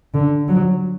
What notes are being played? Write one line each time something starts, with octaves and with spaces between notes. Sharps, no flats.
D3
F#3